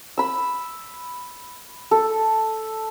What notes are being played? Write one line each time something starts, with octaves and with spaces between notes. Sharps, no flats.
B5 E6
A4